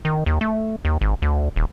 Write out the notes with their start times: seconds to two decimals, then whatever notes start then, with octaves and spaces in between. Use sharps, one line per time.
0.05 D#3
0.26 D#2
0.41 A3
0.85 D#2
1.01 G#1
1.22 D2
1.56 D#1